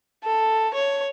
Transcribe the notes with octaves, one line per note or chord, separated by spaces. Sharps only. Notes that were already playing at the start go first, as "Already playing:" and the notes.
A4
C#5